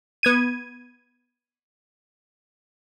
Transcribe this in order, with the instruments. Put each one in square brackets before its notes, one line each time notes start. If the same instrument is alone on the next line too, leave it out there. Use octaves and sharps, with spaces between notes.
[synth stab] B3 G#6 D#7